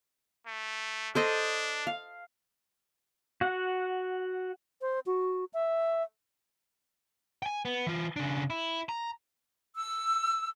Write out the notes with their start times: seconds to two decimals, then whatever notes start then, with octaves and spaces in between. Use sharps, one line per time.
0.46 A3
1.15 D4 A4 C5 D#5
1.87 F5
3.41 F#4 F#5
4.82 C5
5.06 F#4
5.54 E5
7.43 G5 G#5
7.65 B3
7.87 E3 F4
8.16 C#3 D4
8.50 E4
8.89 A#5
9.75 E6